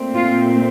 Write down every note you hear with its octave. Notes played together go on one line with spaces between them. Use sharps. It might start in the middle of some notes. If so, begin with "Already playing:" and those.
Already playing: A#2 A3 C4
F4